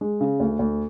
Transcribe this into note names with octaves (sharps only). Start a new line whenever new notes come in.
G#3
C#3
D2
D2